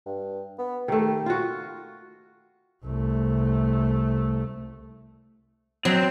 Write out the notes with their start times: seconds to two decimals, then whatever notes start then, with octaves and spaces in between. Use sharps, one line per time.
0.06 G2
0.59 B3
0.88 D#3 A3 G4
1.26 F4 F#4
2.85 C2 A3
5.85 F#3 C4